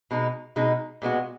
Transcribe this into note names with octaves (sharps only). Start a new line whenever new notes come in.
B2 G#3 D#4
B2 G#3 D#4
A#2 G#3 B3 F#4